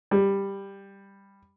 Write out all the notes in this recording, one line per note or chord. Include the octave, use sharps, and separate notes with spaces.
G3